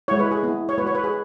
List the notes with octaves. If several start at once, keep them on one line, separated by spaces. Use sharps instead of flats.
G#3 E4 C#5
B4
G#4
B3 E4
C#5
G#3 B3 F#4 B4
C#5
B4
G#4